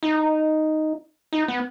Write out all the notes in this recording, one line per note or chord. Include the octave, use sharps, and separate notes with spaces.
D#4
D#4
B3